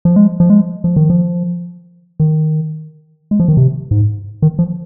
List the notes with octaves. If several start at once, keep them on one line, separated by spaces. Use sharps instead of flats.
F3
G#3
F3
G#3
F3
D#3
F3
D#3
G#3
F3
D#3
C3
G#2
D#3
F3